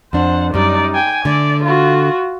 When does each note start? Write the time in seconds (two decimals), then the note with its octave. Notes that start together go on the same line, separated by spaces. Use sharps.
0.13 F2 D4 C5 F#5
0.54 F#2 G3 D#4 D5
0.94 G5 G#5
1.25 D3 A3 D5
1.64 F4 F#4